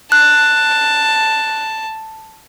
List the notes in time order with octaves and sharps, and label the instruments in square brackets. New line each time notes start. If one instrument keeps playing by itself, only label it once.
[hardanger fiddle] A5 [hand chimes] F#6